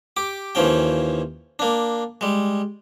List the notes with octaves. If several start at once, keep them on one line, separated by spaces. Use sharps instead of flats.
G4 D6
D#2 E3 F3 C#4 G5
A#3 D4
G3 G#3